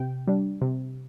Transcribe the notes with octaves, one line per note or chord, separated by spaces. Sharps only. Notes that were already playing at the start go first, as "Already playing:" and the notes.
Already playing: C3 G5
G3 D4
C3